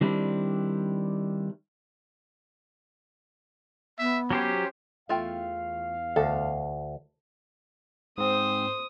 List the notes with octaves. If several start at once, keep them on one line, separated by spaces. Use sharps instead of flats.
D#3 G3 C4 D4 E4
B3 E5
F#3 C#4 G4 C5
E2 A3 F4 F5 G5
D2 A4
G#2 C4 C5 D#6